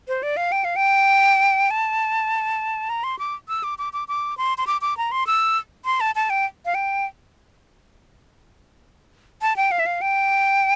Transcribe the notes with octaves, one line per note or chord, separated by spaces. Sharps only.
C5
D5
F5
G5
F5
G5
A5
A#5
C6
D6
E6
D6
D6
D6
D6
C6
C6
D6
D6
A#5
C6
E6
C6
A5
A5
G5
F5
G5
A5
G5
F5
E5
F5
G5